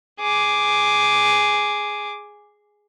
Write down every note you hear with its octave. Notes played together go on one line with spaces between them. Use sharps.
G#4 D6